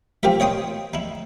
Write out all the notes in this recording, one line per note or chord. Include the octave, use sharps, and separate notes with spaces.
C4 F4 G4 A#4 E5
C#5 D#5 G5 C6 D#6
D#4 E4